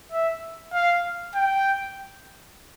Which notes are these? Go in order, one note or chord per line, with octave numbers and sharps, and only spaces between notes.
E5
F5
G5